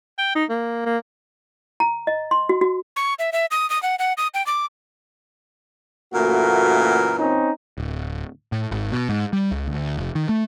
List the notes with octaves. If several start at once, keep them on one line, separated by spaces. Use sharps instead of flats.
G5
D#4
A#3
A#3
A#5
D#5
C6
F#4
F#4
C#6
E5
E5
D#6
D#6
F#5
F#5
D#6
G5
D6
F#2 A#2 E3 A3 A#3 F#4 A#4
C4 C#4 D#4
D1
A2
G#1
B2
G#2
G3
C#2
D2
F1
D#3
A3